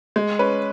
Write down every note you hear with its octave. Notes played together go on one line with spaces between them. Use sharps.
G#3
C#4 B4